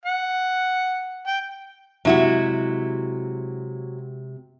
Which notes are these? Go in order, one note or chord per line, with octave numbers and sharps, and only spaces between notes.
F#5
G5
C3 F#3 G#3 E4 F#4